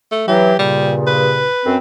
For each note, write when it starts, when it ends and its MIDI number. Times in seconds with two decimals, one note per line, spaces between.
0.11 0.25 57
0.28 0.53 52
0.28 0.53 54
0.28 0.57 67
0.59 1.48 43
0.59 1.48 46
0.59 1.48 49
0.59 0.94 55
1.07 1.77 71
1.66 1.77 42
1.66 1.77 60